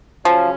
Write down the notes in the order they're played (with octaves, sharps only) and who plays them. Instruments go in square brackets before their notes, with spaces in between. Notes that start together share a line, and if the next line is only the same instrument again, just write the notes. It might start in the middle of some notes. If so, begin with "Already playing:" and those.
[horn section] C#3 F#3 C#4 [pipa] F3